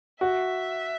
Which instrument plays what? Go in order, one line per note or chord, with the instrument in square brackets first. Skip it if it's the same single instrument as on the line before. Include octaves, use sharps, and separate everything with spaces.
[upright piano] F#4 [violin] E5